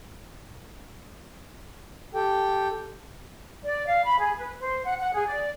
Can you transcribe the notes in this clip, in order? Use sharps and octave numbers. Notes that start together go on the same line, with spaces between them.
G4 A4 G5
D5
F5
B5
G#4
B4
C5
F#5
F#5
G#4
D5